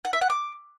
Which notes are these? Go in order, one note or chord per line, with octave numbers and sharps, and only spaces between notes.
F#5
E5
F#5
D6